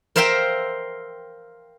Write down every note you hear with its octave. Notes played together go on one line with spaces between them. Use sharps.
A#4 C5 E5 F5 G5 A#5